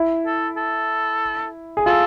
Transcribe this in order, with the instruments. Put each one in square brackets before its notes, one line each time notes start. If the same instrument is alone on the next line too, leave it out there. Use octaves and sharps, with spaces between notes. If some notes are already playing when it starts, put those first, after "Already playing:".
Already playing: [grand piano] E4
[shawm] A4
A4
[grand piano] G#4
[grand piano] F4 [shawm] A4